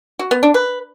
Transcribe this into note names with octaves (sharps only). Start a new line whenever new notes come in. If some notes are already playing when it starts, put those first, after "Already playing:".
F#4
B3
D4
B4